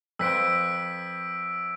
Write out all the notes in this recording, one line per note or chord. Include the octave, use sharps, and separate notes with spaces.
F2 B4 C5 E6 B6 D7